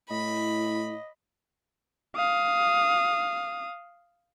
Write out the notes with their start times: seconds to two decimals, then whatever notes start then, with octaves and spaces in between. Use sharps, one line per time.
0.10 A2 E4 D#5 B5
2.17 F5 D#6